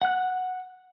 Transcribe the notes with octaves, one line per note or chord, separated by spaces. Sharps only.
F#5 F#6